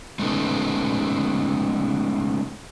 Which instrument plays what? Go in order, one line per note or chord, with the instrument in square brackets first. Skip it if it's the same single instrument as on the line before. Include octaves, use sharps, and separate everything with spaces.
[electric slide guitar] G#3 A3 B3 C#4 D#4 A4